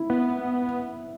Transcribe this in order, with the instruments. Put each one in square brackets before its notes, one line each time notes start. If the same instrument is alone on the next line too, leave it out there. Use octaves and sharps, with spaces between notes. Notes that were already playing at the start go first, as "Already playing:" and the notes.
Already playing: [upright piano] E4
[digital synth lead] B3